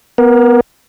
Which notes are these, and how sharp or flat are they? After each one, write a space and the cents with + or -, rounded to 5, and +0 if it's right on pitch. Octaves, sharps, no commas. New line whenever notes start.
B3 +0 A#4 +20